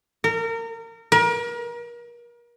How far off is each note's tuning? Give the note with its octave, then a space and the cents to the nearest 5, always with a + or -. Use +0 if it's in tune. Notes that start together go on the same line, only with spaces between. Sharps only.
A#4 -30
A#4 +35